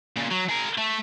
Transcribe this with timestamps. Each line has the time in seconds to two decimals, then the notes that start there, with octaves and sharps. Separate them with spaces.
0.17 A#2 C#3
0.31 F#3
0.49 G#4 A#4
0.78 A3